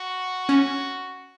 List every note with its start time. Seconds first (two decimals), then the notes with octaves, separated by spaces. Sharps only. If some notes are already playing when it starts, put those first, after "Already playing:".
Already playing: F#4
0.49 C#4